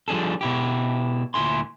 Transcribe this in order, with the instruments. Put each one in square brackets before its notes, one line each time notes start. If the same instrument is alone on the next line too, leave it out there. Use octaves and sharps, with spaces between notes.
[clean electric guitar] F3 G3 D4 G#4 A4
B2 E4 G4
D2 A#2 E4 G#5 C6